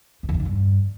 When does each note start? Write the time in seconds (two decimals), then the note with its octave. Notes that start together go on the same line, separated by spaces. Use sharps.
0.23 F#2
0.29 E2
0.34 C3
0.40 D#3
0.45 G2